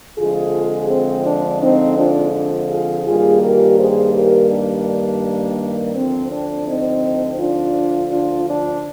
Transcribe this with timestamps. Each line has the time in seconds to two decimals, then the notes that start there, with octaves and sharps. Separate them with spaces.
0.18 F2 D3 F3 G#3 F4 G#4
0.90 C4
1.26 D4
1.62 C4 D#4
1.98 D4 F4
2.70 F4 G#4
3.07 G2 D#3 G3 A#3 F4 G#4
3.43 G4 A#4
3.79 G#4 C5
4.15 G4 A#4
4.51 D4
5.95 D2 D3 F3 C4
6.32 D4
6.68 C4 D#4
7.40 D4 F4
8.12 D4 F4
8.48 D4